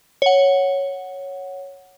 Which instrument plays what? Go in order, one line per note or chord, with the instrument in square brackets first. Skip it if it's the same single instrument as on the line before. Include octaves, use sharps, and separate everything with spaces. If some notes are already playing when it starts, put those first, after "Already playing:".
[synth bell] C#5 F#5